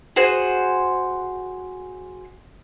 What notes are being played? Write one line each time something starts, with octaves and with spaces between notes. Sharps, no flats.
F#4 G#4 C5